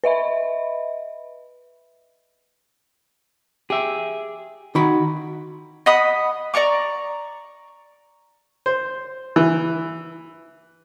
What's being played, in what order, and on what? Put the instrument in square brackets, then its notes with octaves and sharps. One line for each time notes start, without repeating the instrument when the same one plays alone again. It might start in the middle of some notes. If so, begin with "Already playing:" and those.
[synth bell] B4 D#5 E5 B5
[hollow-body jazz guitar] G4 [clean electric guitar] G#4 E5
[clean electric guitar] D#3 [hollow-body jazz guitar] D#4 F#4 B5
[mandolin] D#5 F#5 B5 D#6
D5 A#5 C#6 D6
[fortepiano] C5
E3